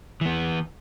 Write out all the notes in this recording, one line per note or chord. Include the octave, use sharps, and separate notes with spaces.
E3 B3